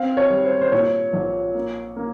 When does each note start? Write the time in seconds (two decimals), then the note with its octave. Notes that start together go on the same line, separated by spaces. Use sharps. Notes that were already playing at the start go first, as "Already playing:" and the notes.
Already playing: C4 F5
0.17 C#5
0.30 G3
0.45 C5
0.61 C5
0.72 A#2 C#5
1.13 A#1
1.55 A#3
1.96 A#3